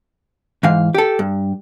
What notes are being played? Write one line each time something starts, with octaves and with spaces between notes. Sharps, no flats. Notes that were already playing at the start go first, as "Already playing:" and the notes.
G#2 E3 F5
G4 A4
G2